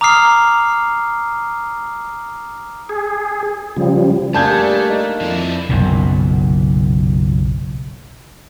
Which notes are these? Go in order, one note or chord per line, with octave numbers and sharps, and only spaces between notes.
A#5 D6 D#6 F6 C7
G#4
C#3 F3 G3
G3 A3 A#3 D4 G#4 A5 G6 G#6
D#4
F2 F3 E4
F#1 B1 F#2 A#2